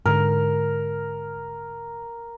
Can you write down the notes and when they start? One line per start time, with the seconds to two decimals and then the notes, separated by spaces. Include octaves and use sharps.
0.06 G#2 D3 A#4